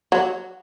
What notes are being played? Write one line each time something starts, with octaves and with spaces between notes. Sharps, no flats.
F#3